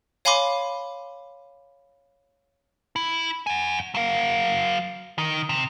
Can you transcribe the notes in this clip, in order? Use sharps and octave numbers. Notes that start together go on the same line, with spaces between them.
C#5 F5 G#5 B5 C6 D6
E4
F#5 G#5
F#3 F5
D#3
C3